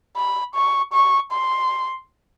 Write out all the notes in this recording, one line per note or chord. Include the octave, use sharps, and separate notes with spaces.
B5
C#6
C#6
C6